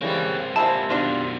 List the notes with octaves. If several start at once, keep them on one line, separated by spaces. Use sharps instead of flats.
C#3 E3 G3 A#3 C4
C3 F3 G3 G#3 E4 A5
B2 D#3 D4 F4